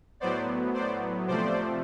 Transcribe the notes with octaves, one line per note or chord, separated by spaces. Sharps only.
A2 F#3 B3 C5 D5
C5 D5
C3 F3 A3 C5 D5